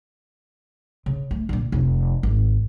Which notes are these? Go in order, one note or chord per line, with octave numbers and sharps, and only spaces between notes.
C#3
A3
A#2 D3
F1 C3
G#1